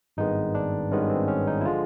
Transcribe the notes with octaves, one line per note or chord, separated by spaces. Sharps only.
G#1 G2 D#3 G#3 B3 D#4
D4
G#1 G2 D#3 G#3 B3 C#4
C4
C#4
D#4
E4
D3 F3 G#3 F4